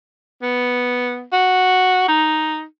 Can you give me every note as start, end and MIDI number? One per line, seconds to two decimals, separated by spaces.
0.42 1.24 59
1.33 2.07 66
2.08 2.64 63